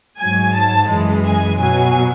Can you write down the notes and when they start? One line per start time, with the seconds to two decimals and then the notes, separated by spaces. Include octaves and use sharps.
0.19 G#2 F#3 G#5
0.54 A5
0.90 F#2 E3 G#3
1.25 G#5
1.60 B2 F#3 G#5